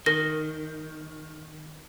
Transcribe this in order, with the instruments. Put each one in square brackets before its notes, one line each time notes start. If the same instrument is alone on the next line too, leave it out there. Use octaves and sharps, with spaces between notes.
[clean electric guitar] D#3 [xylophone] A#4 A#6